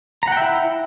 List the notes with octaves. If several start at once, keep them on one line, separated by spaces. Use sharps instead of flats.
E4 E5 F#5 G5 A#5